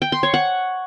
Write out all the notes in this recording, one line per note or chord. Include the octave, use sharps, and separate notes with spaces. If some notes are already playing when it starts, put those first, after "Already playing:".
G5
C6
C#5
F#5